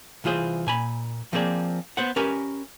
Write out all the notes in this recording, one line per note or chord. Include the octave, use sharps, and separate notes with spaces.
C2 E3 F4 G#4 C5
A#2 G#5 B5
F3 A#3 C4 G#4 D5
B3 C5 F#5
C#4 G4 A#4 B4 G#5